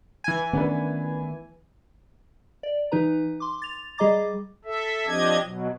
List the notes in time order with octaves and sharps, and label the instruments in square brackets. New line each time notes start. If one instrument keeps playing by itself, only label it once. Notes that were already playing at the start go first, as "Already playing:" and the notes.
[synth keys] E3 G#5
[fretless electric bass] D#3 A3 B3 [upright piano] C#4 D4 B4
[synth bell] D5
E3 D#4 B4 A#5
C6 D6
A6 F7
G3 G#4 D#5 A#5 D6 A6
[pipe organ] A4 E5
F3 C4 D4 G4 D#5 G#6
B2 F#3